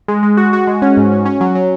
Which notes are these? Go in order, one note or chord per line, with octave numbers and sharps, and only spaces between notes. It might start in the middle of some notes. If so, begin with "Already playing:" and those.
G#3
G#3
F#4
F#4
G#3
C#4
G#2
C#4
C#4
F#3
F#3